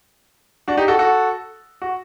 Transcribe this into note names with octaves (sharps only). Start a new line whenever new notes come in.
D4 F#4
D#4 G4
F#4 A4
F#4 A4
F#4